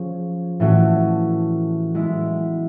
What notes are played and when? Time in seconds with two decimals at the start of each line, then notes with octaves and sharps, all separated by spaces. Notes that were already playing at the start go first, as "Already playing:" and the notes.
Already playing: F3 C#4 G#4
0.60 A2 E3 A3 C#4 F#4
1.95 G#3 B3 E4